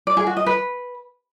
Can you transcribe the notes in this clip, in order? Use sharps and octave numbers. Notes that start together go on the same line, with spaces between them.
D5
G#4
F#4
D#5
B4